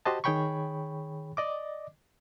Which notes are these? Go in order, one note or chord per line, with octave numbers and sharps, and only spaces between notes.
F#4 G4 C5 D#5 A5
D#3 G#4 C#5 G5 B5 C#6
D5 D#5 D6